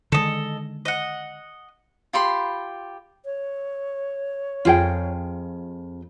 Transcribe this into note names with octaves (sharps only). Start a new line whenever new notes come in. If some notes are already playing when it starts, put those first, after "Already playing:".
D3 D#3 G#3 A4 D#5
D#5 F#5
F4 G4 B5 C6
C#5
F2 F4 G#4 G5